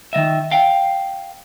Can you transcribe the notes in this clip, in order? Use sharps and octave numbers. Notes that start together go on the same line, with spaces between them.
D#3 F3 D#5 E5
F5 G5